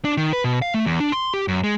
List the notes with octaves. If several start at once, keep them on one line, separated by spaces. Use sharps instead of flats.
D4
D#3
B4
B2
F5
A3
E2
D4
C6
G4
F#2
G#3